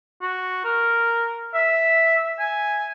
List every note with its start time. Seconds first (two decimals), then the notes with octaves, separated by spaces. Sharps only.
0.22 F#4
0.65 A#4
1.54 E5
2.39 G#5